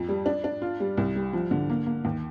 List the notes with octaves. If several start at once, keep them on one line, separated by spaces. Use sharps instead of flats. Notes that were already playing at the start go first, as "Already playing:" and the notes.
Already playing: F2
G3
D4
D4
F4
G3
C2
G3
F3
D3
A#3
A#3
D#2